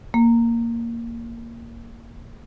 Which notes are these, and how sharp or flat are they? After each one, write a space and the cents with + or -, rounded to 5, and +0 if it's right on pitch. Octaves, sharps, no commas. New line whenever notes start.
A#3 -5